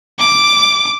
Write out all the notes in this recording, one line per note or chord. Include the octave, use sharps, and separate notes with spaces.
D6